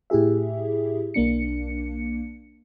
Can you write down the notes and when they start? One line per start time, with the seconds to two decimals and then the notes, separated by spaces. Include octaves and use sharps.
0.10 A2 E4 G4 G#4 E5
1.14 B1 A#3 D4 C#7